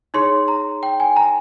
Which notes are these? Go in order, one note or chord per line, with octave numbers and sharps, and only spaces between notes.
D#4 G#4 C#5 C6
A#5
G5
G#5
A#5